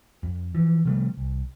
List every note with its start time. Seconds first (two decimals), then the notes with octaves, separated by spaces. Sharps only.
0.23 F2
0.55 E3 F3
0.85 C3 F3 G3 A3
1.17 C2